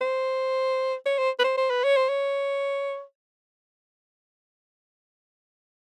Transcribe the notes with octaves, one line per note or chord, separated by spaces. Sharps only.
C5
C#5
C5
B4
C5
C5
B4
C#5
C5
C#5